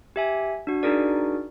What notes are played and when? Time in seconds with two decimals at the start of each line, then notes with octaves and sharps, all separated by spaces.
0.16 G4 E5 G#5
0.67 D4 F#4
0.83 D4 D#4 F#4 G#4 A#4 D5